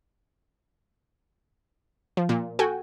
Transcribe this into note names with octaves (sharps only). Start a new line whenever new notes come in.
F3
A#2
F#4 A4 G5 G#5